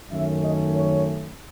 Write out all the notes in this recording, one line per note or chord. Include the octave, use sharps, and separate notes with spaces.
F#2 D#3 A3 C#4 E5
D#5
C#5